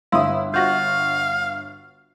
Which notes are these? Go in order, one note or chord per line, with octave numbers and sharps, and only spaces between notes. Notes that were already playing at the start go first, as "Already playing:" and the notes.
G1 E4 E5 F5 C6 D#6 E6
F4 F#4 F5 G6 A#6